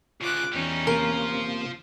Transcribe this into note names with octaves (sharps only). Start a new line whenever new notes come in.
D2 C#3 F4 D6 F#6
E2 G3 C#4 D#4
C3 A#3 F4 A#4 C5